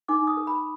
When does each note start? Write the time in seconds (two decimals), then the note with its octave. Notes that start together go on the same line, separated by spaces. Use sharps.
0.08 D#4 D6
0.27 D#6
0.37 A#4
0.47 B5